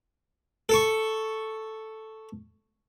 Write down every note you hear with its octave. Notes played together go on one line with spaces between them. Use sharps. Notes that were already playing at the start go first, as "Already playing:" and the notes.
A4 C#6